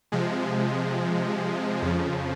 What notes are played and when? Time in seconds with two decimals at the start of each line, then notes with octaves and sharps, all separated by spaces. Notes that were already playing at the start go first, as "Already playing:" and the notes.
0.12 C3 F3 G#3
1.82 F2 C#3 F3